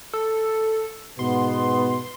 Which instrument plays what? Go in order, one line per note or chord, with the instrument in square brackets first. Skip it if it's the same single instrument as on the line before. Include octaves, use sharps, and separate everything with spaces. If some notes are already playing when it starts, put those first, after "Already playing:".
[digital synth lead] A4
[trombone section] G#2 B2 B3 [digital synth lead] C6